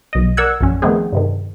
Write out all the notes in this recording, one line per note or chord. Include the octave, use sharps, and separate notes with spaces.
B1 D#5
A#4 D5 F#5 E6 F#6 G#6
A#1 F#2 C#4
D#3 F3 A3 B3 C4 G#4
G2 C3 D#3